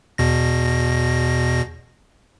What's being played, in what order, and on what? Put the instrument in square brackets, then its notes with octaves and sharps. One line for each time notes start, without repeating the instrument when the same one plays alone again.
[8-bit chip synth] E2 B2 A#6